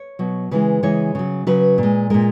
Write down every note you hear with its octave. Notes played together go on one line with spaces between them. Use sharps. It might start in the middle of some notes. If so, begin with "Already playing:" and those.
Already playing: C#5
B2 F#3
C#3 E3 G#3 B4
C#3 E3 G#3 C#5
C#3 F#3
C#3 F#3 B4
A#2
G#3
A#2 G#3 A#4